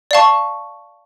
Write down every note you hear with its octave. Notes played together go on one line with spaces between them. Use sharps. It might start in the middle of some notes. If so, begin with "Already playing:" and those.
D5 F5 A5 C#6